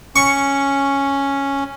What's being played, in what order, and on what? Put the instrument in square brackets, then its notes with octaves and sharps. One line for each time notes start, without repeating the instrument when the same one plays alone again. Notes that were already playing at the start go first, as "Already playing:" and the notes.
[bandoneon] C#4 [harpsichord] C#6